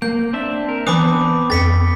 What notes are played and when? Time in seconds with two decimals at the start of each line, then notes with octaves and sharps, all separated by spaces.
0.02 A#3 G6
0.33 C4 D4 E5
0.69 A#4
0.87 E3 B3 C4 D4 B5 D6 D#6
1.50 F2 A6 B6 C#7